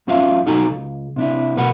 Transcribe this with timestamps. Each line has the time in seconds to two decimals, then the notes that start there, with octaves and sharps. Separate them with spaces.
0.07 F#2 C#4 F4 E5 F5
0.45 B1 D#4 F#4 A4 G#5 A#5
0.69 C#2
1.16 C3 D4 E4
1.56 B2 G#4 A#4 B4 F#5 B5